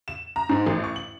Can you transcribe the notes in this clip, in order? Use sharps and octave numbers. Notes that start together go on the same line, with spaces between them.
E7
A#5
G#2
A1
C#6
F#7